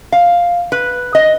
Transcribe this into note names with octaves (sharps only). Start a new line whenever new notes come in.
F5
B4
D#5